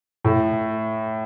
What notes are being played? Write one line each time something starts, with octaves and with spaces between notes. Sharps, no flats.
A2